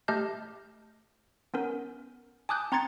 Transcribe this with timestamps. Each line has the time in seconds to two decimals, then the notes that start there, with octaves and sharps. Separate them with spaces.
0.08 A3 G4 D#5 A5 F6 G6
1.54 B3 C#4 A#4
2.49 G#5 A5 D6 D#6 F#6 G6
2.72 C4 A#5 C6 G#6 A6 C#7